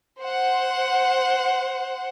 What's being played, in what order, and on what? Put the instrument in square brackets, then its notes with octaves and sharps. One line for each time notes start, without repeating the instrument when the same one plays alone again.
[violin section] C5 F#5